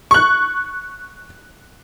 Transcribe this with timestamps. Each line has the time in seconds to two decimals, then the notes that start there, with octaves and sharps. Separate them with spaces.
0.11 C#6 F#6